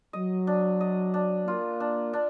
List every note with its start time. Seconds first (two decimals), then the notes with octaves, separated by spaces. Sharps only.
0.13 F#3 D#5
0.47 D4
0.81 D#5
1.14 D4
1.47 A#3 F4
1.80 D4
2.13 D4